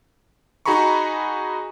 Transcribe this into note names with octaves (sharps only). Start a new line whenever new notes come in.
D#4 F#4 G#4 A#5 B5 C#6